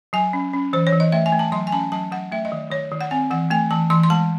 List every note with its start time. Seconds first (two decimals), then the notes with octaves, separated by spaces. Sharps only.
0.13 F#3 G#5
0.33 C#4
0.53 C#4
0.73 E3 C5
0.87 C#5
0.93 E3
1.00 D#5
1.12 A3 E5
1.26 G#5
1.32 A3
1.39 A5
1.52 F#3 C6
1.67 G#5
1.72 C#4 A5
1.92 F#3 A5
2.12 F#3 F#5
2.32 A3 E5
2.45 D#5
2.52 D#3
2.71 D#3 C#5
2.91 D#3
3.01 F#5
3.11 C4 G#5
3.31 E3 F#5
3.50 A3 G#5
3.71 E3 A5
3.90 E3 C6
4.03 C6
4.10 G#3 A5